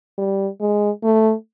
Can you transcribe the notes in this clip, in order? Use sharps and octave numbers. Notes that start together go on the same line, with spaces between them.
G3
G#3
A3